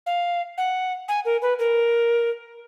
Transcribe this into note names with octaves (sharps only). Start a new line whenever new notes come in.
F5
F#5
G#5
A#4
B4
A#4